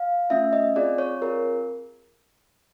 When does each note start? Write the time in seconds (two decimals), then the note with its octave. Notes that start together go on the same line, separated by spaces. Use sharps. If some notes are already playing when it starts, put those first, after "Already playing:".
Already playing: F5
0.30 A3 C#4 F4 E5
0.53 D#5
0.76 C4 F4 G#4 D5
0.98 C#5
1.21 C4 F4 G#4 A#4